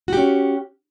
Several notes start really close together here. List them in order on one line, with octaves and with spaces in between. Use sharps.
F#4 G4 C#4